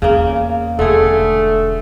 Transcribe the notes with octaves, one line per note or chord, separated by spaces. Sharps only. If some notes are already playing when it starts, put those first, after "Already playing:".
E2 C#3 A#3 C#4
E1 D3 A3 G#4